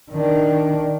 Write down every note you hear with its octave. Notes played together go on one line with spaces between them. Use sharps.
D#3 D4